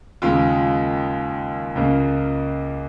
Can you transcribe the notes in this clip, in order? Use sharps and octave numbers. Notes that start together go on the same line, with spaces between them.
D#2 C#3 G#3 F4
C#2 C#3 A#3